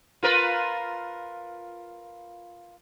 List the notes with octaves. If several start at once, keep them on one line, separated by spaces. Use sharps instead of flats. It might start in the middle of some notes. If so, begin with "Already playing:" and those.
F4 A#4 B4